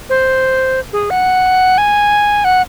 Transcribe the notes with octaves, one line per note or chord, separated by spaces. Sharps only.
C5
G#4
F#5
G#5
F#5